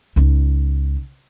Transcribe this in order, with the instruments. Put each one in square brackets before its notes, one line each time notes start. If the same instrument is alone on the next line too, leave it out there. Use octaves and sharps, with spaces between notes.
[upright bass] C#2 D#4